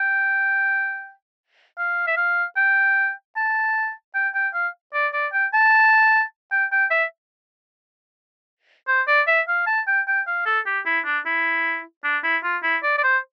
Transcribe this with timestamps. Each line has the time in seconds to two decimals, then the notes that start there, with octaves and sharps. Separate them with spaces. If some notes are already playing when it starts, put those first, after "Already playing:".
Already playing: G5
1.78 F5
2.07 E5
2.17 F5
2.57 G5
3.36 A5
4.15 G5
4.34 G5
4.54 F5
4.94 D5
5.13 D5
5.33 G5
5.54 A5
6.52 G5
6.72 G5
6.91 E5
8.88 C5
9.08 D5
9.27 E5
9.48 F5
9.67 A5
9.87 G5
10.08 G5
10.27 F5
10.46 A4
10.66 G4
10.86 E4
11.05 D4
11.26 E4
12.04 D4
12.24 E4
12.43 F4
12.63 E4
12.83 D5
12.98 D5
13.04 C5